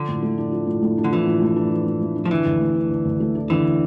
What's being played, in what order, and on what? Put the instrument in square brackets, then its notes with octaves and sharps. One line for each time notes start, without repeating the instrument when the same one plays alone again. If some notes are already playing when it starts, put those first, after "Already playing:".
Already playing: [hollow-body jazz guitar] D3 [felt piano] F3
[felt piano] A2
A3
D4
F3
A2
A3
D4
[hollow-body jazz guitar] D3
[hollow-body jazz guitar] E3 [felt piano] F3
[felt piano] A2
A3
D4
F3
A2
A3
D4
[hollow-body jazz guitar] F3
[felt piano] D3 [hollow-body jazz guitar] E3
[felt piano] D2
A3
D4
D3
D2
A3
D4
[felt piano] D3 [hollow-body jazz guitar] E3